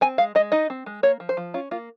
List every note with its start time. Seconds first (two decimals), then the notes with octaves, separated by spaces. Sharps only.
0.01 C4 G#5
0.18 G#3 F5
0.35 G#3 D#5
0.52 D#4 D#5
0.70 C4
0.86 G#3
1.03 A#3 C#5
1.20 F3
1.29 C5
1.37 F3
1.54 C#4 F4
1.71 A#3 F4